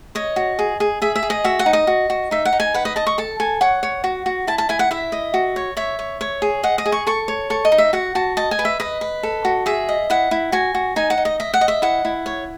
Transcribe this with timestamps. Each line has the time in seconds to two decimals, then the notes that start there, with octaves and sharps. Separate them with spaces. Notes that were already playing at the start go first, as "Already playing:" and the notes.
0.15 C#5 D#5
0.36 F#4
0.59 G#4
0.80 G#4
1.02 G#4 E5
1.16 E5
1.23 G#4
1.30 D#5
1.44 F#4 E5
1.59 F#5
1.66 D#4
1.73 D#5
1.87 F#4
2.10 F#4
2.31 D#4 E5
2.45 F#5
2.53 D#4
2.60 G#5
2.74 B4 F#5
2.85 D#5
2.96 D#5 A5
3.07 C#6
3.18 A4 A5
3.40 A4 G#5
3.61 C#5 F#5
3.83 C#5
4.04 F#4
4.26 F#4
4.47 E4 A5
4.58 A5
4.69 E4 G#5
4.79 F#5
4.91 E4 E5
5.12 D#5
5.34 F#4
5.56 C#5
5.77 C#5 E5
5.99 C#5
6.21 C#5
6.42 G#4
6.63 D#5 F#5
6.78 D#5
6.86 G#4
6.92 C#6
7.07 A4 C#6
7.28 C#5
7.50 A4 C#6
7.65 D#5
7.72 D#4
7.78 E5
7.93 F#4 F#5
8.15 F#4 A5
8.37 D#5 A5
8.51 G#5
8.59 B4
8.65 E5
8.80 B4 D#5
9.01 B4
9.23 A4
9.45 F#4
9.66 G#4 E5
9.89 D#5
10.10 E4 F#5
10.31 E4
10.52 F#4 G#5
10.75 F#4
10.96 D#4 G#5
11.10 F#5
11.18 D#4
11.25 D#5
11.40 D#5 E5
11.54 F#5
11.61 D#5
11.68 E5
11.82 E4 F#5
12.05 E4
12.26 C#5